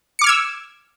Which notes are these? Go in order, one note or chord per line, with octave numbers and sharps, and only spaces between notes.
D6 E6 F6 G#6 C#7